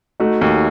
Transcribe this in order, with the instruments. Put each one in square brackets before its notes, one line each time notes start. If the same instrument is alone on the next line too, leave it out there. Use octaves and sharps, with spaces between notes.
[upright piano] A3 [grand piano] D#4 F#4
[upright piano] D#2